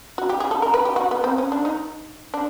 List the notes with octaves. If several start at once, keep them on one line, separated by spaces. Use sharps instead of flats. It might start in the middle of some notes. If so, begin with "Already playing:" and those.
F#4
G4
G#4
A4
A#4
B4
G4
F#4
B3
C4
C#4
D4
D#4
D4